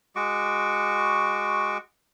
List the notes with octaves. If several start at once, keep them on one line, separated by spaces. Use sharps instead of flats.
G#3 F#4 C#6 D6